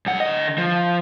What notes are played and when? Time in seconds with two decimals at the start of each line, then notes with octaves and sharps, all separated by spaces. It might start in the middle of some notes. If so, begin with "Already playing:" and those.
0.06 F#2 F#5
0.20 D3 D#5
0.58 F3